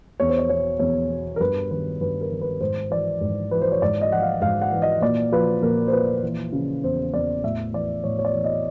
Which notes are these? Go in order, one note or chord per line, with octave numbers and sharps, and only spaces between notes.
E2 C#5
C5
C#5
B2 C#5
E2 C#5
B2
A#4
G2 B4
D#3 B4
G2 B4
A#4
D#3
B4
G#2 C5
E3 D5
G#2
E3 B4
C5
C#5
G#2 D5
D#5
E3 F#5
F5
G#2 F5
F#5
E3
D#5
A#2 D5
F3 B4
A#2 A#4
C5
F3 B4
E3
C#3
E2 C5
E2 D5
A2 E5
E3 D5
A2 C#5
C#5
D5
E3
D#5